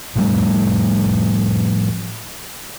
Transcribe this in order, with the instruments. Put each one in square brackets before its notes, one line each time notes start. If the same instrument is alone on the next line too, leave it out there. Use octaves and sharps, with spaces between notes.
[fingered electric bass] A2 F3 G3 A3